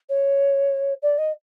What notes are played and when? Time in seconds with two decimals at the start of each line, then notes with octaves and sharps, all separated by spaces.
0.09 C#5
1.02 D5
1.18 D#5